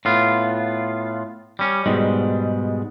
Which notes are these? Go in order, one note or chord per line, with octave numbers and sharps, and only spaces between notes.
A2 B3 F4
G3 C#4
G#2 B2 G3 G#3